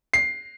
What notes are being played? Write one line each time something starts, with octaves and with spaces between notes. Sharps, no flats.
C7